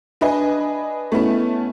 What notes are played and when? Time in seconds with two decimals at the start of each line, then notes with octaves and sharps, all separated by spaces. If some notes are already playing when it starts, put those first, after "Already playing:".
0.21 D4 B4 D#5 G#5
1.12 A3 B3 C#4 E4